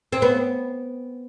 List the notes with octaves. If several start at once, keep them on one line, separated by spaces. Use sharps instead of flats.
C4
B3